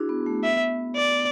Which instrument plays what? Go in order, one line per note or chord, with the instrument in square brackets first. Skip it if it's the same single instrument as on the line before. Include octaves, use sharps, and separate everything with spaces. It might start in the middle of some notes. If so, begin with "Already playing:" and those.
Already playing: [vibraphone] D4 E4 F#4 G#4
B3
A3
[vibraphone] B3 [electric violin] E5
[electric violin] D5